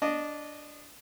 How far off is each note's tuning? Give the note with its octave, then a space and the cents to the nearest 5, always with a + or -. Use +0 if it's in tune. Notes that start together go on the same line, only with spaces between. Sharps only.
D4 -10 D#5 -25